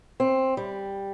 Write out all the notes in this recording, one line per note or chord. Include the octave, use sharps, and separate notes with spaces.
C4
G3